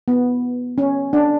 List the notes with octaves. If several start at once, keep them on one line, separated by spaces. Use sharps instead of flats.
B3
C#4
D4